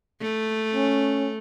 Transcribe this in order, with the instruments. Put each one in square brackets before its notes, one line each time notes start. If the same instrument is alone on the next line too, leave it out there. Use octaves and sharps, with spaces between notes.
[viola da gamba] A3
[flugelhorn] C#4